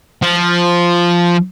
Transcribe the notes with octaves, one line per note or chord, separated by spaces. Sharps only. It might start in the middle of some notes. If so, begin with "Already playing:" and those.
F3